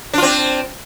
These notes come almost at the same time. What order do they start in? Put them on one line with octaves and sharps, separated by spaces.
D4 F4 C4